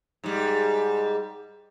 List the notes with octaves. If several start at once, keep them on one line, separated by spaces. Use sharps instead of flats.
G#2 G3